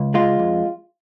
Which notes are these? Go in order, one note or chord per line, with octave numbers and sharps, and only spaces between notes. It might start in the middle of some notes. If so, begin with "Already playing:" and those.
Already playing: C#2
G#3 F4
F2